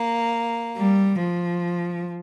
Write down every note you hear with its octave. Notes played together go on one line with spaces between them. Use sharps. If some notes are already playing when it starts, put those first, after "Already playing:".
Already playing: A#3
G3
F3